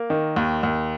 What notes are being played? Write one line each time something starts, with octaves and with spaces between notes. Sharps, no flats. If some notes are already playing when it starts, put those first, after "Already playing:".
Already playing: A#3
D#3
D#2
D#2